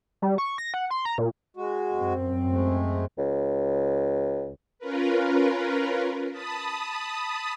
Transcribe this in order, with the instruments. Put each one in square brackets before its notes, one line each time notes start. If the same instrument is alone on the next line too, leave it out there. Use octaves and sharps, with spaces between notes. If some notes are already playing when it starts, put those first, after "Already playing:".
[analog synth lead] G3
C#6
A#6
F#5
C6
A#5
A#2
[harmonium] G#3 F#4
[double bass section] F#2 C4
[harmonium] G#3 A3
[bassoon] C#2
[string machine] C#4 F4 A#4 B4
A5 B5 D#6